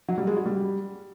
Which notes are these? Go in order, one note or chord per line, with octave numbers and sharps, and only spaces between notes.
F#3
G3
G#3
F#4
G3